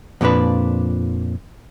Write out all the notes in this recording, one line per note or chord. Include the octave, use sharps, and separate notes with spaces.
F2 A#2 F3 D4 B4